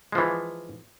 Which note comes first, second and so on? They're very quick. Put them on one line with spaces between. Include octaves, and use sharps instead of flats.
G#3 F3 E3